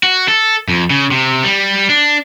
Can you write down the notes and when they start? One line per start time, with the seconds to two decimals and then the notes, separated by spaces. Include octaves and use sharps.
0.03 F#4
0.28 A4
0.68 F2
0.90 C#3
1.12 C3
1.44 G3
1.90 D4